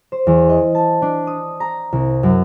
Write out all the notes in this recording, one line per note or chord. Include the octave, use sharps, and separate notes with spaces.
C5
E2
D#5
A5
D4
D#6
A#5
C2
F#2